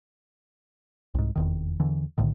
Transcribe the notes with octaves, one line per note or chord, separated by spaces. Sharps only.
C2 G#2
F1 E2 D#3
E2 D3 E3
B1 A2 D3 D#3